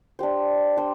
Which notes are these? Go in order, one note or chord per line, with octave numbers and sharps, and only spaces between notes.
D4 G4 C5
D4 G4 C5